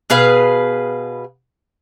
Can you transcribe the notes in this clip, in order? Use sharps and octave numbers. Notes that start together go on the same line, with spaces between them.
B2 G#4 B4 F5